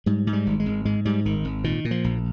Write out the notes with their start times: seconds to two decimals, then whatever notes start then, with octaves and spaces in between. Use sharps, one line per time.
0.06 G#2 G3
0.27 G#2
0.33 G3
0.46 G#1
0.60 G#3
0.66 G#1
0.85 G#2 G#3
1.05 G#2 G3
1.25 G#1 D#3
1.45 G#1
1.64 A#2 D#3
1.85 A#2
1.91 F3
2.04 A#1